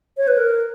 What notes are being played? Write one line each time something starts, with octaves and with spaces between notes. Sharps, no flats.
C#5
B4
A#4